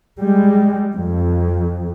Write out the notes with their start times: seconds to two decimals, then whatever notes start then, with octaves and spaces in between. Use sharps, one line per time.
0.20 G3 G#3
0.94 F2